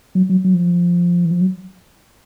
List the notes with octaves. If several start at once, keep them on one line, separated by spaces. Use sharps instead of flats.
F#3
F#3
F#3
F3
E3
F3
F#3